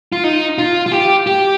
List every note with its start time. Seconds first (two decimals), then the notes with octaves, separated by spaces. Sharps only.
0.12 F4
0.24 D#4
0.58 F4
0.86 F4
0.92 G4
1.27 G4